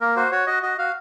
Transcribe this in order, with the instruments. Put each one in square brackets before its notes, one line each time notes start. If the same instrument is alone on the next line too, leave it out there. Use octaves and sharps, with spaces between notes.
[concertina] A#3 A#4
F#4 C5
F#4 C#5
F#4 D#5
F#4 D#5
F#4 F5